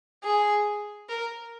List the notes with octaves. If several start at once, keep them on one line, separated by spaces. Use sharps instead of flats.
G#4
A#4